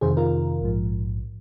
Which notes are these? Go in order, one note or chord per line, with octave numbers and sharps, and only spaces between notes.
F2 C3 D#3 G#4 C5
F4 A#4
A#1 G#2 F3